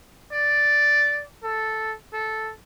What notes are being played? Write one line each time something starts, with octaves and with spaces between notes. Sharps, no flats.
D5
A4
A4